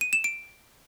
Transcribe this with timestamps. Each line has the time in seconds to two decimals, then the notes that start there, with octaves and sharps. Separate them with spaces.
0.01 D#7
0.13 E7
0.24 D7